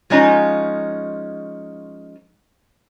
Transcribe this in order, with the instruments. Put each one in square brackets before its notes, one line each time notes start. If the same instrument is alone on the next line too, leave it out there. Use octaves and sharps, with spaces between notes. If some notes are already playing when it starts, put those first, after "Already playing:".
[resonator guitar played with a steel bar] F3 G#3 C#4 D#4 F4 A#5